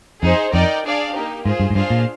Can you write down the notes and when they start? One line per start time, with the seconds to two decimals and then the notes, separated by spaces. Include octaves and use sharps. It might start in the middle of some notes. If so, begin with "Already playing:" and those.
0.22 F2 D#4 G#4 C5
0.53 F2 D#4 A#4 D5 G5
0.84 D4 G#4 D5 F5
1.14 A#3 D#4 G4
1.45 G#2 F4 G#4 C5
1.60 G2
1.70 G#2
1.75 G2 D4 F4 G#4 C5 F5
1.90 A#2